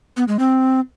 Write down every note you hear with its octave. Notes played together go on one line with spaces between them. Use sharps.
B3
G#3
C4